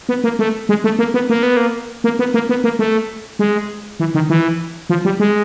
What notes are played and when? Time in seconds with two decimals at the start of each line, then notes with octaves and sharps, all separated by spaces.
0.09 B3
0.24 A#3
0.39 A3
0.69 G#3
0.84 A3
0.99 A#3
1.14 B3
1.29 A#3
1.43 B3
1.57 A#3
2.04 A#3
2.19 B3
2.34 A#3
2.49 B3
2.64 A#3
2.79 A3
3.39 G#3
4.00 E3
4.14 D#3
4.29 E3
4.90 F3
5.05 G3
5.20 G#3